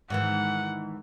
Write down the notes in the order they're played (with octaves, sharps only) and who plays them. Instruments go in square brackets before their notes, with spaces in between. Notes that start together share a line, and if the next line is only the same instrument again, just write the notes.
[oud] G#2 D#3 E3 [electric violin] F#5